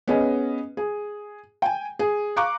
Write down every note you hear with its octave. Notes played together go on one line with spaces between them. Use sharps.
B3 C#4 G#4 B4 D#5
G#4
G5 G#5
G#4
F5 A#5 C#6 D6 F#6